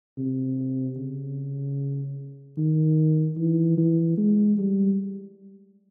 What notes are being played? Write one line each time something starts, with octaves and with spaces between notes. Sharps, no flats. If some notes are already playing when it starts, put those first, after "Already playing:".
C3
C#3
D#3
E3
E3
G#3
G3